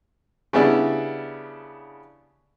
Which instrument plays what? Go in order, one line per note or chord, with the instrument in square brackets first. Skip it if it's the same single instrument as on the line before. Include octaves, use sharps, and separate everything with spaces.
[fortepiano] C#3 G3 B3 D4 E4